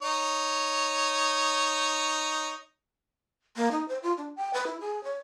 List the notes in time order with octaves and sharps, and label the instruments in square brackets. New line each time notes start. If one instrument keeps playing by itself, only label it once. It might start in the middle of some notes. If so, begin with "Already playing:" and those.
[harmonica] D#4 C#5
[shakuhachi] A#3
D#4
C5
F4
D4
G5
B4
E4
G#4
C#5